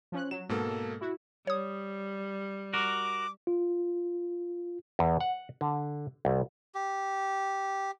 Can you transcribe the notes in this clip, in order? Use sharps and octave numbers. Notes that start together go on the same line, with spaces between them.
F3 C#4 F#6
F#3 E7
G#2 B2 A#3 A4
E4 F#4
G3 C#5 D#6
F#4 A#4 D6
F4
E2
F#5
D3
C2
G4